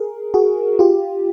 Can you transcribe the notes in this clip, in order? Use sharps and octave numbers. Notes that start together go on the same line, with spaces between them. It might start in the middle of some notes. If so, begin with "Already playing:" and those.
Already playing: G#4 A#4
F#4 G#4
F4 G4